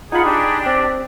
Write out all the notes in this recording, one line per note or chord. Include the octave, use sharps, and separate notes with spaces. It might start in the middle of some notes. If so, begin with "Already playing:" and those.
D#4 F4 G#4 F#5 B5
D4 G4
C4 D5